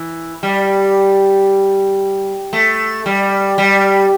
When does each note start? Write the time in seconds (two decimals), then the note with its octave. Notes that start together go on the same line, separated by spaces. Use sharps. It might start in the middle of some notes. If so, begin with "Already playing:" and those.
Already playing: E3
0.43 G3
2.53 A3
3.06 G3
3.58 G3